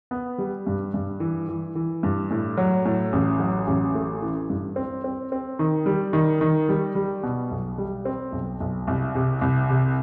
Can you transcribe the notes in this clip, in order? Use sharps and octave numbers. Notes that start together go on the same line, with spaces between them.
B3
G3
G2
G2
E3
E3
E3
G2
A2
F#3
A2
A1
F#3
A1
A3
E3
G2
C4
C4
C4
D#3
G3
D#3
D#3
G3
G3
B2
B1
G3
C4
B1
B1
C2
C3
C2
C3